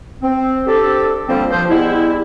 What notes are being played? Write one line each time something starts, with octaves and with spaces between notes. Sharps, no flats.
C4
C4 D4 G4 A4
D3 F3 G3 A#3 C4
F3 C5
G3 G#3 B3 E4